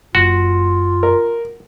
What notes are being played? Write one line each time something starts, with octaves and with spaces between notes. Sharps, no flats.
F#1 F4 F#4
A#4